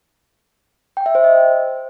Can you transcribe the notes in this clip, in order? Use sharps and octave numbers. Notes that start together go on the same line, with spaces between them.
G5
E5
C5
D#5